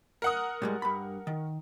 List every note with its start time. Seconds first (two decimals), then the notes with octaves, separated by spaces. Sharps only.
0.22 A#4 F#5 D#6
0.62 A2 G3 G#3
0.82 G2 B5
1.27 D#3